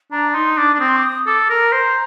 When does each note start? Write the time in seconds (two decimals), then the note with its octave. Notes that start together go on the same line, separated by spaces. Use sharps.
0.12 D4 A#5
0.34 D#4 C6
0.57 D4 D6
0.74 D4
0.80 C4 D#6
0.88 C6
0.96 D6
1.03 D#6
1.26 A4 D6
1.50 A#4 A#5
1.72 C5